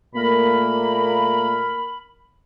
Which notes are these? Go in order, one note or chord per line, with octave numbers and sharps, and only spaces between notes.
A#2 A3 A#3 A#4 B5